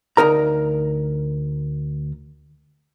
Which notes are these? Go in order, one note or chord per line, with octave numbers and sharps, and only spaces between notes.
D2 D#4 A#4 A#5